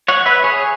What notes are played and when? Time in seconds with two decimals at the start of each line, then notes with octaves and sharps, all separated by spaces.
0.08 C#5 F#5
0.26 B4 E5
0.44 G#4 C#5